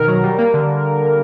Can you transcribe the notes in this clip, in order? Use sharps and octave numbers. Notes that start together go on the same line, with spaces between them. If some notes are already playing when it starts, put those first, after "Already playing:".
Already playing: B2 D#3 A#4
F#3
G3
A#3
D3